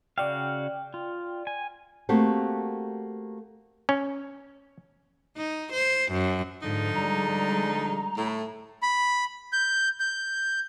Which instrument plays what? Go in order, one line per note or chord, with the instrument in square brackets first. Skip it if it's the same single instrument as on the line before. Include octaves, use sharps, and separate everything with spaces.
[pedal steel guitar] C#3 F#4 F5 [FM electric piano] D5 G5
[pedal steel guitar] F4
G#5
[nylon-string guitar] A3 A#3 C4 F#4 G4 A4
[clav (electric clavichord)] C#4
[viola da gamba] D#4
C5
F#2
[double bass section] G#2 [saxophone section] D3 F3 D#4
[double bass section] G3 G#3 [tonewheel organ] A#5
[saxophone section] A2
[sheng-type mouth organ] B5
G6
G6